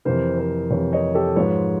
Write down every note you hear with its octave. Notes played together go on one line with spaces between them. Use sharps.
F2 C3 E3 A#4 C5
A#4 C5
F2 C3 E3 B4 C#5
C#5 D#5
G4 A4
G#2 F3 B4 C#5